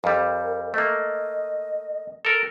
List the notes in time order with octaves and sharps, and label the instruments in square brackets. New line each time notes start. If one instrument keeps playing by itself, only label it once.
[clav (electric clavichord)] F2 G3 [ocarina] A#4
[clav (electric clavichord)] A3 A#3 [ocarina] D#5
[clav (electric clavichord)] A4 A#4